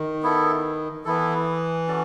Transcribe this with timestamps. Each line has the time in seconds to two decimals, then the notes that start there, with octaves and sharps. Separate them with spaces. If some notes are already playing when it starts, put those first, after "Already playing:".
Already playing: D#3
0.23 B3 E4 A4
1.05 E3 B3 E4 A4
1.87 C#4 F#4 A4 D5